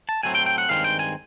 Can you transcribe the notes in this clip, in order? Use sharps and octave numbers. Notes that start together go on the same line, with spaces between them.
A5
A2 F#3 A3 C4 G#5
G5
G5
F#5
G2 D#3 G#3 C4 F5
G5
G#5